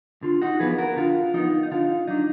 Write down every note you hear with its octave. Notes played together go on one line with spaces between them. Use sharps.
D3 F4
D#4 F#4
F3 B3 G#4 B4
F#4 A#4
D3 F4
F3 B3 D#4
D#4
D3 F4
F#3 D4 D#4